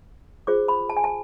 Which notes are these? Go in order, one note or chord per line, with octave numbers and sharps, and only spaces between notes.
F4 G#4 C5 D6
B5
A5
G#5
A5